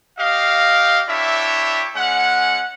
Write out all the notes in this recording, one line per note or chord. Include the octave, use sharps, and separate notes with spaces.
G4 D#5 F5
D4 E4 G4 C#5 E5
G#3 C#4 F#5